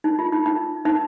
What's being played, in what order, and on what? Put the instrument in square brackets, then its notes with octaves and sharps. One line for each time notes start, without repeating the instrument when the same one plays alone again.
[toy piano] D#4
F4
D#4
D#4
D#4